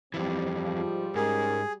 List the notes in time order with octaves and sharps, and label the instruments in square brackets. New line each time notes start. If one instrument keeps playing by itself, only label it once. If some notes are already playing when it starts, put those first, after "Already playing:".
[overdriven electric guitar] F2 E3 [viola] G3 [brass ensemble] C4
[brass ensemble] G#2 F3
[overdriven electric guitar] G#2 [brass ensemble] C#4 A#4 [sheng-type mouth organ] G#4